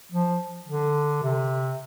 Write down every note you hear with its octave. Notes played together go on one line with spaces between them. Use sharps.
F3
D3
C3